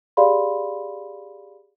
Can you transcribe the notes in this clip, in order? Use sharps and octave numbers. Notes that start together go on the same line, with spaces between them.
G4 G#4 D5 F5 B5 C6